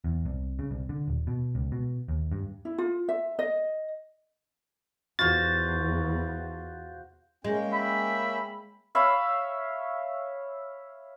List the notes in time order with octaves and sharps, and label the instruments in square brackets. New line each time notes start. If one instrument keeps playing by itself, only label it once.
[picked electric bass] E2
C2
C#3
C2
D3
D#1
B2
C#2
B2
D#2
G2
[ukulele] E4
F4
E5
D#5
[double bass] E2 [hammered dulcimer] F4 F#4 C5 [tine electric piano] A6
[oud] G#3 [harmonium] A#3 C#4 G5
[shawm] E5 [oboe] B5
[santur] C#5 E5 F5 B5